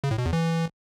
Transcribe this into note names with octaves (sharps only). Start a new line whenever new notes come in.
C#3
A2
B2
E2
E3